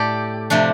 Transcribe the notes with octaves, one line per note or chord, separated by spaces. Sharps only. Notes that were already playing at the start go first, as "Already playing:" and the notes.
Already playing: A2 A3 G4 A4 D5
C3 F3 A3 D4